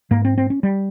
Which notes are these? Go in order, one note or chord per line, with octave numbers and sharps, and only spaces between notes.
G#2 A#3
C4
C4
C#4
G3